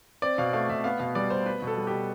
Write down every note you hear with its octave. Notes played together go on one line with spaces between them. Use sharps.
C4 D5
B2 F5
A3 F5
B2 E5
B3 F5
B2 F5
G3 D5
B2 C5
B3 B4
B2
A4
G3
B2 G4